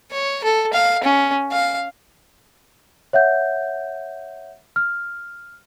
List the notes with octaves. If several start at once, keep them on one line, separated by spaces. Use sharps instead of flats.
C#5
A4
F5
C#4
F5
C#5 E5 F#5 G6
F6